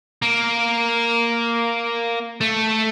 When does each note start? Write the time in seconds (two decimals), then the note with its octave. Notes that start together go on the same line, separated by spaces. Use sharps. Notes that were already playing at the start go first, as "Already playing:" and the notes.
0.22 A#3
2.41 A3